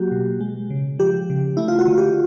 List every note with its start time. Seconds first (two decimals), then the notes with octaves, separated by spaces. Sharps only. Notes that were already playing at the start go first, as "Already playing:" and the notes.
Already playing: F#3 A#3 F#4 G4
0.11 B2
0.40 G#3
0.70 C#3
0.99 F3 G4
1.30 C#3
1.57 A3 E4
1.68 F4
1.79 F#4
1.88 D3
1.98 G4